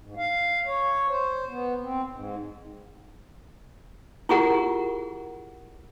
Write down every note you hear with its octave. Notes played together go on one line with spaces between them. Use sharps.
G#2
F5
C#5
C5
B3
C4
G#2
E4 F4 G4 G#4 A#4 F#5